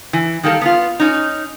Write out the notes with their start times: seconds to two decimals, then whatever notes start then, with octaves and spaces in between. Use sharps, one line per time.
0.13 E3
0.43 D#3 G3 A#3 A4
0.61 B3 F4
1.00 C#4 D#4